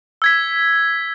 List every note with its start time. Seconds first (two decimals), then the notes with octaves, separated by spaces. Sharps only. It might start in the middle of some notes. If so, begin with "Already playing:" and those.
0.22 E6 G#6 B6